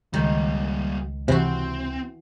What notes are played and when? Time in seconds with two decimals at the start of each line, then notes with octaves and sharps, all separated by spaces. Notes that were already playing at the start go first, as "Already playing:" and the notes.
0.14 C#2 D#3 G3 A#3
1.28 C3 E3 C4 F#4